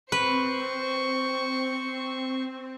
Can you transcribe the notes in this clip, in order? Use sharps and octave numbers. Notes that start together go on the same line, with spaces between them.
C4 B4 C5 C#6